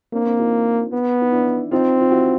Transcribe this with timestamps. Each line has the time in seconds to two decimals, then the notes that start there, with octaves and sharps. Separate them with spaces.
0.13 A#3 C4 D4
0.26 C4 D4
0.39 D#4 F4
0.93 B3
1.22 D#4
1.32 D4 E4
1.71 C4 D#4 F4
2.01 F4
2.11 E4 F#4